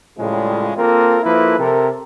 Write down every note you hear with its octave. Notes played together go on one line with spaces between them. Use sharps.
A2 C#3 F3 G3 G#3
A#3 C4 F4 A4 A#4
F3 A#3 E4 A4 B4
C3 A4 A#4